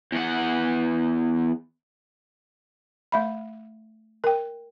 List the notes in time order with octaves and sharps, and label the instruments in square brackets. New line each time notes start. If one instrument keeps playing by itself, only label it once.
[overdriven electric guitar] E2 F#5
[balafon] A3 E5 B5
A#4 G5